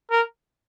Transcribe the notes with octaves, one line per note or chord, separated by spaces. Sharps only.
A#4